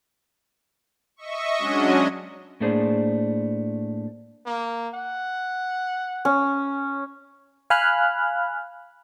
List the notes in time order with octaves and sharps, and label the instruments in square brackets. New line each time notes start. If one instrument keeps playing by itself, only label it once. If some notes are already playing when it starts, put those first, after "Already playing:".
[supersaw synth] D#5 E5 C#6
F#3 G#3 C#4 D4 F#4 D#5
[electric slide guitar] A2 A3 A#3 D4 G#4 C5
[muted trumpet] A#3
F#5
[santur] C#4
[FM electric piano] F5 G#5 B5 F6 F#6